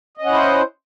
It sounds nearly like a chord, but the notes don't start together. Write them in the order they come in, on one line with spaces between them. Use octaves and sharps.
D#5 C#4 F#5 E4 C5